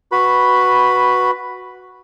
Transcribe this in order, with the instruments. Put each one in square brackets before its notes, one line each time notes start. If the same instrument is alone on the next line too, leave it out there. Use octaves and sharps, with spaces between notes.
[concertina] F#4 B4 B5